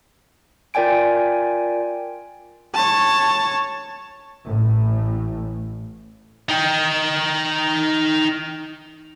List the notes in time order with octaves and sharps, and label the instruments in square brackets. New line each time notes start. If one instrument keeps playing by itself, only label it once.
[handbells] F4 A#4 D5 G5 G#5 D7
[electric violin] C#5 A5
[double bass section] A1 A2
[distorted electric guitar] D#4 G5